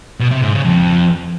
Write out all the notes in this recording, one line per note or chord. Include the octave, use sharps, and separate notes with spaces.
B2
C3
G#2
C#3
F2